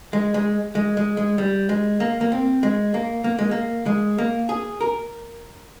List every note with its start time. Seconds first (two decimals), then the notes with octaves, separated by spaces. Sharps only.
0.13 G#3
0.34 G#3
0.75 G#3
0.97 G#3
1.17 G#3
1.38 G3
1.69 G#3
2.00 A#3
2.21 A#3
2.32 C4
2.63 G#3
2.94 A#3
3.24 A#3
3.39 G#3
3.51 A#3
3.86 G#3
4.18 A#3
4.49 G#4
4.81 A#4